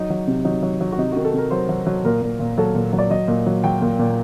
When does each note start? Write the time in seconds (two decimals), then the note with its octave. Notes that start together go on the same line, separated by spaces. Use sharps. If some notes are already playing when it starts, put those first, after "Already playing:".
Already playing: F#3 D#4
0.10 F#3
0.27 C3
0.45 F#3 D#4
0.63 F#3
0.81 F#3
0.92 F#4
0.98 C3 D#4
1.12 F#4
1.16 D#3
1.25 A4
1.34 C3 A#4
1.51 F#3 C5
1.69 F#3
1.86 F#3
2.05 A#2 A#4
2.22 A#2
2.40 A#2
2.58 F#3 A4
2.75 A#2
2.93 F#3
2.98 D5
3.10 F#3 D#5
3.28 A#2
3.46 F#3
3.64 F#3 G5
3.82 A#2
3.99 A#2